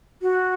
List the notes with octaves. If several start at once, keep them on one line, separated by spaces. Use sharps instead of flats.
F#4